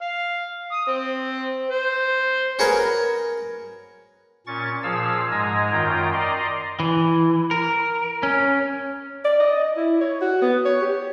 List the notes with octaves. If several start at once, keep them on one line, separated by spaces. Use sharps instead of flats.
F5
D#6
C4
C5
C#4 F#4 G#4 A#4 B4
A#2 C#4 C#6 A6
A#2 F3 G#4 F5 E6
G#2 G#3 G#5 A#5
F#2 D#3 F4 G5 A#5
D5 D#5 A#5 C6
E3
A#4
C#4
D5
D#5
E4
C#5
F#4
B3
C#5
G4